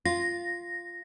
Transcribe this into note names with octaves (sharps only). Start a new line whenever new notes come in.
F4 A#6